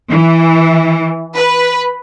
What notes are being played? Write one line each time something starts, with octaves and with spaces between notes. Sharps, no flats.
E3
B4